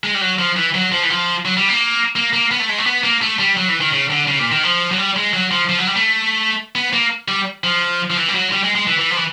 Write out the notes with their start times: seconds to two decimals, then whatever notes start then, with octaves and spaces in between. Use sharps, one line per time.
0.04 G#3
0.14 G3
0.21 F#3
0.39 F3
0.56 E3
0.75 F#3
0.92 F3
1.03 E3
1.10 F3
1.45 F#3
1.57 G3
1.68 A#3
2.16 A#3
2.33 A#3
2.51 B3
2.60 A3
2.69 G#3
2.78 A3
2.86 B3
3.04 A#3
3.22 A3
3.39 G3
3.57 F#3
3.69 E3
3.81 D#3
3.92 C#3
4.10 D3
4.28 C#3
4.39 A#2
4.52 D#3
4.63 F3
4.92 F#3
4.98 G3
5.16 G#3
5.34 F#3
5.51 F3
5.69 F3
5.78 F#3
5.87 G3
5.96 A3
6.75 B3
6.93 A#3
7.28 G3
7.64 F3
8.10 F3
8.17 E3
8.28 G3
8.34 F#3
8.52 G3
8.64 G#3
8.75 G#3
8.87 E3
8.99 E3
9.10 F3
9.17 E3